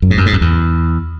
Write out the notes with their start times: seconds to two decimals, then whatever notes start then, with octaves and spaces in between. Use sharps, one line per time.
0.02 F#2
0.10 G#2
0.18 F#2
0.26 G#2
0.33 F#2
0.41 E2